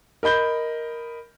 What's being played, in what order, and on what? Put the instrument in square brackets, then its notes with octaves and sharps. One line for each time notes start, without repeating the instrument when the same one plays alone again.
[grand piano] A#4 D#5 B5 G6 G7